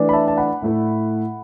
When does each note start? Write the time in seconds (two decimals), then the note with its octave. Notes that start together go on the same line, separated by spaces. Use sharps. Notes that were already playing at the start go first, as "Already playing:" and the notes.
Already playing: E3 A3 D4
0.09 B5
0.13 E5 A5
0.28 A5
0.37 F#5 B5
0.62 A2 A3 E4